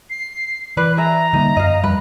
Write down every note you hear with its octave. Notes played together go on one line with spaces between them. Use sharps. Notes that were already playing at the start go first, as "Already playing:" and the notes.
C7
E3 B4 D5 F#6
G#4 E5 A#5
D3 G3 A#3 D#4
F#2 D#5 F5
F2 G3 B4